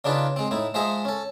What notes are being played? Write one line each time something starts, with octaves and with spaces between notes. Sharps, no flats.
C#3 D4 D#4 F4 B4
G#3 C4
A2 D#4 E4
F3 G#3 G#4 C5 E5 A#5
C#4 A4